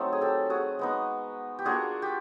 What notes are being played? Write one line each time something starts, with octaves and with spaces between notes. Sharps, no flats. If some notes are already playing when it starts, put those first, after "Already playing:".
Already playing: F#3 A3 C4 D#4
G#4
G4 A4
F#4 G#4
G#3 B3 D#4
G4
A#3 D4 F4 F#4 G#4
G4